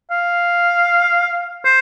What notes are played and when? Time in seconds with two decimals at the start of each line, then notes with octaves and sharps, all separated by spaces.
0.11 F5
1.65 C5